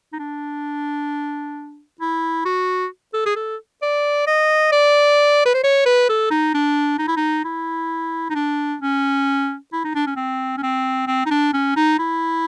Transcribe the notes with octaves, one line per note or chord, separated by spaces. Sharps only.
D#4
D4
E4
F#4
A4
G#4
A4
D5
D#5
D5
B4
C5
C#5
B4
A4
D#4
D4
D#4
E4
D#4
E4
D#4
D4
C#4
E4
D#4
D4
C#4
C4
C#4
C4
C4
D#4
D4
C#4
D#4
E4